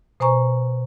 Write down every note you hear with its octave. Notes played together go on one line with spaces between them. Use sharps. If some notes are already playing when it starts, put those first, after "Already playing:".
B2 C5 G#5 A#5 C#6